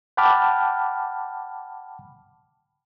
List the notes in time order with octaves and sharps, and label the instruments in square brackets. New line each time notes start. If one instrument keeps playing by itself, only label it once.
[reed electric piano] F#5 G5 A5 B5 D6 F6